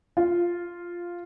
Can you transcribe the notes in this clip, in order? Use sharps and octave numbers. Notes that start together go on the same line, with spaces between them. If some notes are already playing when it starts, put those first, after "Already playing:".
F4